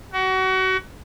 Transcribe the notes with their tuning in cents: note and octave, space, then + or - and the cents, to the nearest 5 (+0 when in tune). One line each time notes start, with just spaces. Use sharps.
F#4 +30